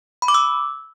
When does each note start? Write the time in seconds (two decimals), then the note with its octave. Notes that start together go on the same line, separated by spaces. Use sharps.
0.22 B5
0.28 D6
0.34 E6